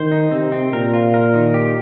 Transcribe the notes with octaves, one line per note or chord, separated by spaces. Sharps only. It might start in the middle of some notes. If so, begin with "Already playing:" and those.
Already playing: D#3 C5
D#4
C3 C4
C4
A#2 A#4
F4
A#4
D#3
G4